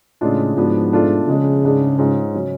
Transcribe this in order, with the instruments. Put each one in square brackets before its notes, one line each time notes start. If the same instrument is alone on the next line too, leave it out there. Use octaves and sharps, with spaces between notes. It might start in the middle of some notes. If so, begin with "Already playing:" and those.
[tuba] A2 [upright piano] C#3 G#3 D4 F4
[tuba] G#2 [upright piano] F3 B3 D4 F#4
[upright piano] B2 A3 D4 F4 A4
[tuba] C#3 [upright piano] F3 G#3 D4 G#4
[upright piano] G#2 G#3 D4 G#4
G#2 G#3 C#4 F4 G#4
C#3 F#3 C#4